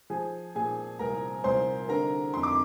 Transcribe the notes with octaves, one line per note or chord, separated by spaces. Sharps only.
F3 G#4 G#5
A#2 G#4 G#5
C2 A#4 A#5
C2 C5 C6
D3 A#4 A#5
F2 C6
D6